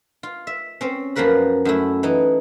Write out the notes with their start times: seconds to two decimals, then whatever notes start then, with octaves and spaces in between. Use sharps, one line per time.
0.23 F4
0.47 E5
0.81 C4 C#4
1.15 F#2 F3 A#3 A#4 B4 B5
1.65 F#2 A3 E4
2.03 E3 D#4